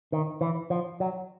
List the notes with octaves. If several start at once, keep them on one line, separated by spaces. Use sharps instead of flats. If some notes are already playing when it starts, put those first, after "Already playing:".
D#3
E3
F3
F#3